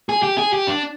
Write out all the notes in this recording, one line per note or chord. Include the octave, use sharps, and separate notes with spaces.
G#4
G4
G#4
G4
D4